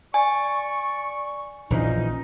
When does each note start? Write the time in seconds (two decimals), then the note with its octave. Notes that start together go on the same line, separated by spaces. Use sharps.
0.14 D5 G#5 C#6
1.70 A#1 E3 F3 C#4 D#4